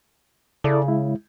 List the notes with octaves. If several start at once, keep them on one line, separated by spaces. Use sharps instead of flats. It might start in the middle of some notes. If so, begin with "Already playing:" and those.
C#3 E4 A4 D5
G#3 E4